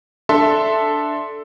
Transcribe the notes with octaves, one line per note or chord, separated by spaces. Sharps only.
D4 A4 E5 C6